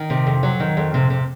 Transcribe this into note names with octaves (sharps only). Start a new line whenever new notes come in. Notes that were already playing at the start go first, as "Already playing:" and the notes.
Already playing: D#3
C3
F2
F#3
D#3
F2
C3
C3